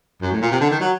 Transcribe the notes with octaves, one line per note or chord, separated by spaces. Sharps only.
F#2
A2
A#2
C3
D3
D#3
F#3